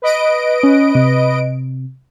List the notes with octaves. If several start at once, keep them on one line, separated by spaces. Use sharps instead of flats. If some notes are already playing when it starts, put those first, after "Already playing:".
B4 D#5 D7
C#4
C3